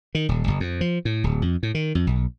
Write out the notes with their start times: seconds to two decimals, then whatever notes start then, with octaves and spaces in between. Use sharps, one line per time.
0.15 D#3
0.29 D#1
0.48 F#1
0.60 F2
0.81 F3
1.05 A2
1.24 D1
1.42 F2
1.63 A2
1.75 D#3
1.95 F2
2.07 B1